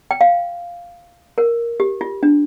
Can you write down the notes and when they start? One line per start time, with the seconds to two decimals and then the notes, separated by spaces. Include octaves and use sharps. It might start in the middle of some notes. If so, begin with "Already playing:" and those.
0.11 G5
0.21 F5
1.38 A#4
1.80 G4
2.01 F4
2.23 D4